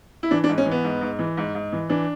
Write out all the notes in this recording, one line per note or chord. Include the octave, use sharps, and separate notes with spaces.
E4
E3 D4
D4
G#2
C#4
E3
B3
G#2
G#2
E3
G#2
G#2
E3
E3 D4